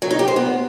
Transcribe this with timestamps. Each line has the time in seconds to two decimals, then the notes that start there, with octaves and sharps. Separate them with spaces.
0.02 F#3
0.11 D#4
0.19 G4
0.28 C5
0.36 B3